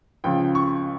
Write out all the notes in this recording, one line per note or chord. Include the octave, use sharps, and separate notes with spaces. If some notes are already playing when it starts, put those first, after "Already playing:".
C#2 C#3 F3 G5
C#6